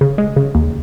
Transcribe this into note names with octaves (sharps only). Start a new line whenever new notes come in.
C#3
G#3
C#3
D#2